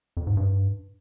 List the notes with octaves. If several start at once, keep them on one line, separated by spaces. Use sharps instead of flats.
F2
G#2
G2